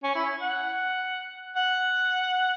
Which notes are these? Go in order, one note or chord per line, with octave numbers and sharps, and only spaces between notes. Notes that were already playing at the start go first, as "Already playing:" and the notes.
C#4
E4
F#5
F#5